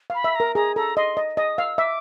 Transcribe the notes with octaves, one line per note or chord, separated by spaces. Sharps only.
F5 B5
E5
A#4 A#5
G#4 A#5
A4 A#5
D#5 C6
D#5
D#5 D#6
F5 E6
E5 D6